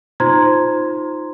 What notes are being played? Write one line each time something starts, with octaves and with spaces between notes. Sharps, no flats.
D#4 F4 C5 A#5 C6 G#6